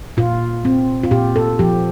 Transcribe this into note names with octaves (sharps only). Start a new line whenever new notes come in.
A#2 F4
C4
F4
A#2 G4
A4
F3 G4